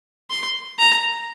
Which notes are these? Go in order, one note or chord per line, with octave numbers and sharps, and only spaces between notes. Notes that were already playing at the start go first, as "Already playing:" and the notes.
C6
A#5